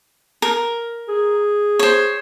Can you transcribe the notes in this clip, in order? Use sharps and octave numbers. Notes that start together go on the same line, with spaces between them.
A#4
G#4
C5 C#5